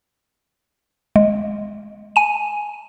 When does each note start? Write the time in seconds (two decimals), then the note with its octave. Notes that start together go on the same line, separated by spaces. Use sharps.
1.16 G#3
2.16 G#5 D#7